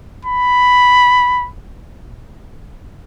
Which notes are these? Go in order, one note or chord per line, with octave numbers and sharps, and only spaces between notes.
B5